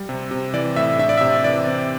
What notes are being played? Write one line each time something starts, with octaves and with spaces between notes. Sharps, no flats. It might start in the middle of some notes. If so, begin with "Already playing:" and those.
Already playing: G3
C3
C3
E3 D5
A2 E5
D4 E5
D5
E5
C3
E3 D5
C4